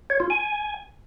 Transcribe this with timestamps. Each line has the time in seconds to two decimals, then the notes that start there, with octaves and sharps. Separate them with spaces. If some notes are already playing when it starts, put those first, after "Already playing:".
0.10 C#5
0.20 F4
0.30 G#5